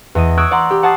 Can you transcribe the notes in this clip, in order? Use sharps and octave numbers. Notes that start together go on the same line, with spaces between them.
E2 D#5 D#7
C#6 D#6 E6 F#6 G#6 D7
D5 F#5 A#5 C6
G4
F#5 A5 C#6 D#6 A6 C7